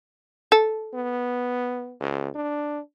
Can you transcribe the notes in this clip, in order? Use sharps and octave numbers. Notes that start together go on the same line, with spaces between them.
A4
B3
C#2
D4